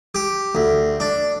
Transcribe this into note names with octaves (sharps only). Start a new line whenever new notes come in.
G4
D2
D4